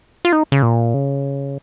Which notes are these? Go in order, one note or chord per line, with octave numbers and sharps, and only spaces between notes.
F4
D#4
C#3
A#2
C#3